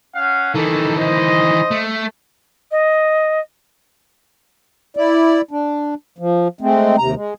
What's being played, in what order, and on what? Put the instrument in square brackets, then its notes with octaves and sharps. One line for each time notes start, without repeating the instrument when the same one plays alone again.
[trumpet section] C#4 F5 F#5
[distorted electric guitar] D#3 E3 [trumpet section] D#4 A4
[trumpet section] C5 D#5
[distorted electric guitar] A3
[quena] D#5
[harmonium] E4 D5
D4
F3
G#3 A3 C4
D#2 C3 A#5
G#3